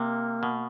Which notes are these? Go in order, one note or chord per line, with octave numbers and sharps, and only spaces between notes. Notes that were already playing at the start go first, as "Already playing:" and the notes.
Already playing: C3 A#3
B2